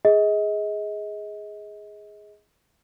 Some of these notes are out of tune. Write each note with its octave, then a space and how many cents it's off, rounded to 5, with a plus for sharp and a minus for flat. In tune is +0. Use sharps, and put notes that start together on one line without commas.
G#4 +0 D#5 +30